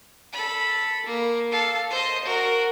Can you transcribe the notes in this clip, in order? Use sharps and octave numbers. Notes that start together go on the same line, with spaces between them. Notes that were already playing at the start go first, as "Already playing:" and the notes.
A4 B5
A#3
A4 F5
C5 D#5
F#4 A#4